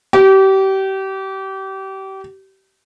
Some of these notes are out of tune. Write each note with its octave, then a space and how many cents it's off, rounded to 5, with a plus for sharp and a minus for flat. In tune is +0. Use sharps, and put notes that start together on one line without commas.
G4 -30